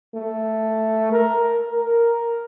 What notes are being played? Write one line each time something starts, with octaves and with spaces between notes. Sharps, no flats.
A3
A#4
A#4